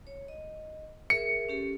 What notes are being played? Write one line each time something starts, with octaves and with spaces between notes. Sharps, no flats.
C#5
D#5
G#4 A#4 E5 C#7
C#4 G4 A4